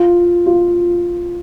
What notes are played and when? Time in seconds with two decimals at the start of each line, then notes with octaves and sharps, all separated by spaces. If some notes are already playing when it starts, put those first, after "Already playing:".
Already playing: F4
0.46 F4